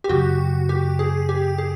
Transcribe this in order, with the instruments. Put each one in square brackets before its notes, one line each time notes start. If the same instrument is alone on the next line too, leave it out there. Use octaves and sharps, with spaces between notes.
[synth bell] G4
[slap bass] F#2 C#3 F#3 [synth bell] F#4
[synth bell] G4
G#4
G4
G#4